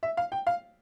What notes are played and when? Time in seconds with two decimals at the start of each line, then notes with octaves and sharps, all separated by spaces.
0.03 E5
0.17 F5
0.32 G5
0.47 F5